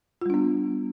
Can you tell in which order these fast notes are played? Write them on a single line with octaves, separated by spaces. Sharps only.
F4 G3 D4 B3